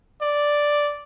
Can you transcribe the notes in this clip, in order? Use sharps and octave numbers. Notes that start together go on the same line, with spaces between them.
D5